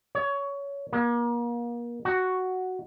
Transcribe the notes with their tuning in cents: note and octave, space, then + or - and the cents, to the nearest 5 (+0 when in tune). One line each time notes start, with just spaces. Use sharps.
C#5 +20
A#3 +35
F#4 +5